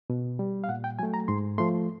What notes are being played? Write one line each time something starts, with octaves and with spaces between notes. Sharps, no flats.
B2
G3
F5
A#2 F#5
G5
F#3 A3 G#5
A#5
G#2 C6
F3 A3 C6